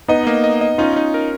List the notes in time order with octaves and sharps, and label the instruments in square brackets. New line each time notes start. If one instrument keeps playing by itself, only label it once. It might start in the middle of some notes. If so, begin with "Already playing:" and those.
[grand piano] B3 D#4 [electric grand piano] D#5
[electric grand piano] A#3
D#5
D#5
[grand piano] C#4 F4 [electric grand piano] D#4
[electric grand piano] D#4
A#4